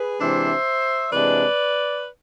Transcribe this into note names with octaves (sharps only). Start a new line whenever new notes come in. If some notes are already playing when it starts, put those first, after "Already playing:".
Already playing: G#4 B4
C3 E3 G#3 D4 C5 E5
C3 E3 G#3 D4 B4 D5